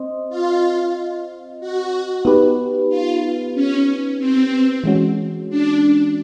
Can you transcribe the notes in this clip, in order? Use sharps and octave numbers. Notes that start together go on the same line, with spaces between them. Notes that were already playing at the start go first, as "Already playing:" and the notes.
Already playing: C4 C5 D#5
F4
F#4
B3 D#4 G4 B4
F4
C#4
C4
E3 G#3 C#4 F#4
D4